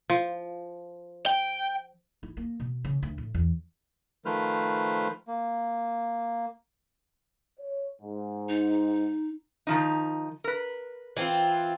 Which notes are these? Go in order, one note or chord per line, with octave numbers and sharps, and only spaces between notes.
F3
G5
E4
A#3
B2
C#3
D2
A2
E2
D#3 F3 A3 B4 C5 F6
A#3
C#5
G#2
D#4
D#3 F3 D#4
A#4 B4
E3 C4 F4